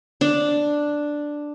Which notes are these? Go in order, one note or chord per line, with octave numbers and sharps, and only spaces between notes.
D4